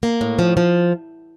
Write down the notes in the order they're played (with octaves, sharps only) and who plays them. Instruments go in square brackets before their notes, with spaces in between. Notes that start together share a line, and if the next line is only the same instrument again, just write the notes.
[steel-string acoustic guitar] A#3
A2
F3
F3